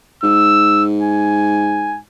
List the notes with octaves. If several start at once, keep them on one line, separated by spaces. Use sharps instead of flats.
G#2 E6
G#5